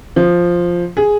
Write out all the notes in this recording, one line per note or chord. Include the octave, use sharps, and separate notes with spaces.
F3
G#4